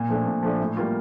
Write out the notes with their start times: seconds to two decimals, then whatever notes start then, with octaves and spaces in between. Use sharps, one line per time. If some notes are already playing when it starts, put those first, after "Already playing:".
Already playing: A#2
0.09 F3 A3 D4
0.26 A#2
0.43 F3 A3 D4
0.60 A2
0.77 G3 A#3 F4